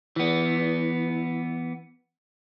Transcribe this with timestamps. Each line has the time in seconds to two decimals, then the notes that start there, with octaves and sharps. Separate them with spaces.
0.16 E3 B3